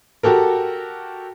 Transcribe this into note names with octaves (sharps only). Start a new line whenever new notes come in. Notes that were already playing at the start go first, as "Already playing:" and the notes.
F#4 G4 A4 A#4